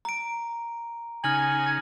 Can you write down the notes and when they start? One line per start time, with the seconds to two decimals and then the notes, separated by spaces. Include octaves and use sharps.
0.05 A#5 D7
1.24 C#3 D#4 G#5 F6 F#7